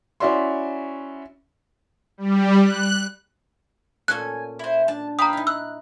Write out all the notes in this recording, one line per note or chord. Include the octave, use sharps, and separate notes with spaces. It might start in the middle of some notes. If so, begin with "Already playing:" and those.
C#4 E4 F#4 D5 E5 C6
G3
F#6
A#2 C#4 A4 G#5 F#6
E4 C5
D4 A5
B4 F5 G5 A#5 D#6
D#4 E4
E6 F#6